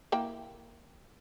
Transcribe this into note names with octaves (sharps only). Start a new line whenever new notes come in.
A#3 E4 G5